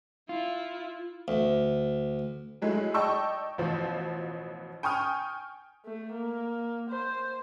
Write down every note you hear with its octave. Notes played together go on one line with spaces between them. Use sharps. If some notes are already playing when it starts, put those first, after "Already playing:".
E4 F4
D2
F#3 G#3 A3 E4
D5 D#5 G5 A5 C#6 E6
A1 B2 F3 C5
G5 G#5 C#6 D#6 F6
A3
A#3
C5